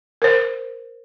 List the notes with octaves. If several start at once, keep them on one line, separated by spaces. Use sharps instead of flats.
A#4 C5